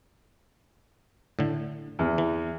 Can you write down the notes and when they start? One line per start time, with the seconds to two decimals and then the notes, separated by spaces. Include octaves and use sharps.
1.39 A2 D3
1.99 E2
2.18 E3